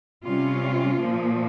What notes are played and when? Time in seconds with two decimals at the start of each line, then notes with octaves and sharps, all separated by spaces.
0.24 C3 G3 C#4 F4
1.00 A#2 F3 A#3